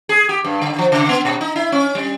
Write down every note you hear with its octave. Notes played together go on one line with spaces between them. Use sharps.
G#4
G4
G2
D3
F3
C#3
B3
B2
D#4
E4
C#4
G3